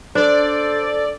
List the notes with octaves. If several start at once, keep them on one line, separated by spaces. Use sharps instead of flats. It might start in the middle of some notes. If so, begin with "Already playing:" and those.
D4 A4 C5 D5